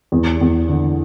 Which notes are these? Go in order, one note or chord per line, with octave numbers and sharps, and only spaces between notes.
E2
E2
D3